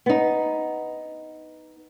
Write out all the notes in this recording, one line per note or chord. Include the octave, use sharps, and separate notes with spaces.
B3 D#4